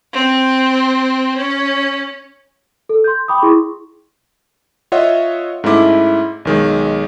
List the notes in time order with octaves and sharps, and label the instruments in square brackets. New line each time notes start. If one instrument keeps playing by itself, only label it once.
[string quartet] C4
C#4
[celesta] A4
C6 G6
G5 B5 D6 D#6
E4 G#4 C6 C#6
[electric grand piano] F4 C#5 D#5 E5 F#5
G#2 A3 C#4 E4 D6
B1 D#3 G#3